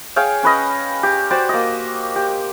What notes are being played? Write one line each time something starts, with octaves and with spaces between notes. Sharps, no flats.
G#4 C#5 F5 G5
C#4 B4 D#5
G4
F#4 G4 C5 D5
A#3 D#5
G4